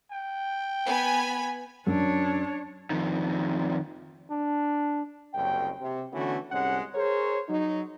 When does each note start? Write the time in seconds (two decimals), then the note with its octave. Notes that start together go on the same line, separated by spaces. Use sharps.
0.11 G5
0.87 B3 G#5 B5
1.87 F#2 D4 C#5
2.90 F2 D#3
4.31 D4
5.34 F#1 C2 F#2 G5
5.81 C3
6.13 D3 E3 A3 B3 C#4 F#4
6.51 C2 G#2 G#3 C#4 F#5
6.95 G#4 A#4 C5 C#5
7.49 F#3 D#4